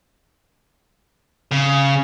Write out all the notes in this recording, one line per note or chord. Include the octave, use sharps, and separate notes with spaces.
C#3